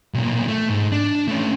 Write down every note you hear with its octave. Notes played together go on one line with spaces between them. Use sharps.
B1 A#2
A3
G#2
D4
A3 C#4